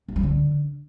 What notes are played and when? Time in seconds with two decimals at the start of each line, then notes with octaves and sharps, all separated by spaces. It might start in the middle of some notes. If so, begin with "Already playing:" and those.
0.08 G2
0.16 F3
0.23 D3